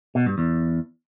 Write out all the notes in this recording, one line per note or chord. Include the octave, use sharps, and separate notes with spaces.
B2
G2
E2